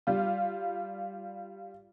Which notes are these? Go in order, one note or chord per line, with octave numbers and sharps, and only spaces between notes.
G3 F4